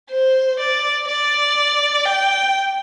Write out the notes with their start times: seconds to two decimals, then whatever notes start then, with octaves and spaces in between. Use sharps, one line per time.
0.11 C5
0.59 D5
1.08 D5
2.06 G5